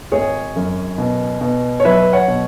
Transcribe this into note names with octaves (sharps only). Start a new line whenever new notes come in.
G#1 G#4 C#5
F#2
B2
B2
C#5
F#3 B4 E5
C#5 F#5
B2